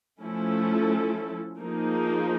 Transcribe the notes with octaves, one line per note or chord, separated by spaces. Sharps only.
F3 A3 C#4 E4 A4
F3 A#3 D#4 G#4